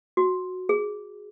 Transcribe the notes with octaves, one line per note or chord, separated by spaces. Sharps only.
F#4
G#4